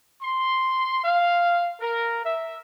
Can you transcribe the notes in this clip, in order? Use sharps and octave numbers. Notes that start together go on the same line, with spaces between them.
C6
F5
A#4
E5